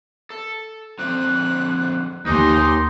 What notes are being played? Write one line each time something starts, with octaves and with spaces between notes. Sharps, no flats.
A4
D3 F3 C4 F#6
D#2 D#4 B4 C#5 G#5 C6 D6